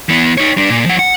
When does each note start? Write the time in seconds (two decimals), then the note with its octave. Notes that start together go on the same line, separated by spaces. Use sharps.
0.09 E3 B3
0.38 D#4 C#5
0.57 G3 D4
0.70 A#2
0.86 F3 F#5
0.99 F#5